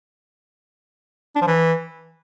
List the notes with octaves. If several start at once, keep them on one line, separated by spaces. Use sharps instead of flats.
D4
F3
E3